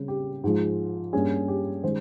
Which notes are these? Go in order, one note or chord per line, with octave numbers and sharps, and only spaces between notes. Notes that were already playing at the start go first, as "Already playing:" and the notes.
Already playing: C#3 G3 C4
G4
G#2 F3 G#3
G2 G3 A#3 C#4 G#4
G4
D#3 G#3 C#4 C5